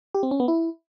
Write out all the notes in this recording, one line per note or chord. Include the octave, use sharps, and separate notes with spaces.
G4
C4
C#4
B3
E4